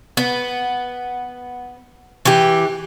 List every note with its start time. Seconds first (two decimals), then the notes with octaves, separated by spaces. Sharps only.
0.17 B3
2.25 E3 G4